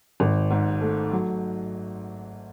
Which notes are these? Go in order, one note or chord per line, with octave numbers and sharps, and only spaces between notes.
G#1
G#2
A3
F#3